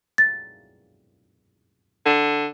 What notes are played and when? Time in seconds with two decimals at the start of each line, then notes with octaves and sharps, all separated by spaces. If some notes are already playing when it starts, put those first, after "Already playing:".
0.18 A6
2.06 D3